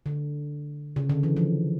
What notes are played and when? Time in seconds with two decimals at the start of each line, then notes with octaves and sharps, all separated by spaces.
0.06 D3
0.96 C#3
1.09 D3
1.23 E3
1.36 F3